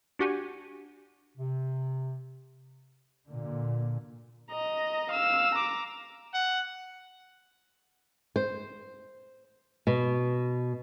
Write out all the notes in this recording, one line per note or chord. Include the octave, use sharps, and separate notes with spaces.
D4 F#4 G4 F#5 G#5
C3
A#2 D3
D#5 A#5
F5 E6
A#5 D6
F#5
C5
B2